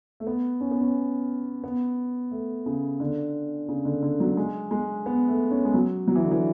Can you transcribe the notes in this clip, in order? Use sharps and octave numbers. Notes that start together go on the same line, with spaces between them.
A3
B3
C#4
B3
C#4
B3
A3
C#3
D3
C#3
D3
D3
F#3
G#3
G#3
B3
A3
C#4
G#3
F#3
F#3
E3
D3
E3